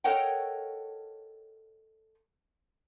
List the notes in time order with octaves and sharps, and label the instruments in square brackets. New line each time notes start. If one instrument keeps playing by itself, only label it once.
[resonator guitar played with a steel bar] A4 A#4 C#5 D#5 F#5 G5